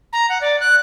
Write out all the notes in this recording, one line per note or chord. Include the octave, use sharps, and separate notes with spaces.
A#5
F#5
D5
F#6